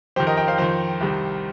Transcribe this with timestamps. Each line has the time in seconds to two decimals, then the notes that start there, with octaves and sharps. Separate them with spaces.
0.16 F2 D#3 G4 C5
0.27 A#4 D#5
0.37 D#5 G5
0.48 C5 F5
0.58 F2 D#3 C5 F5
1.01 C2 C3 D#3